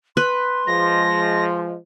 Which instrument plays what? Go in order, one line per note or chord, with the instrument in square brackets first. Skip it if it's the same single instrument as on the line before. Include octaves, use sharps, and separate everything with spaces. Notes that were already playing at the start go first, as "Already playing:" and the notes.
[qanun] B4 [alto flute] C6
[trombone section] F3 G#3 [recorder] A#6